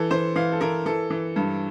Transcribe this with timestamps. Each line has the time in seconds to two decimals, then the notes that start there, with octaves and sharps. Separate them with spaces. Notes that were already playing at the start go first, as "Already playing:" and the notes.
Already playing: E3 A4
0.11 E3 C5
0.36 E3 F5
0.52 A4
0.61 E3 A#4
0.86 E3 A4
1.10 E3
1.36 G2